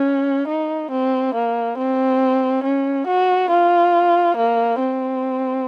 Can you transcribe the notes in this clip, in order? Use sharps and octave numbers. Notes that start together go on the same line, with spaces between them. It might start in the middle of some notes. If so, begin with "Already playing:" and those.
Already playing: C#4
D#4
C4
A#3
C4
C#4
F#4
F4
A#3
C4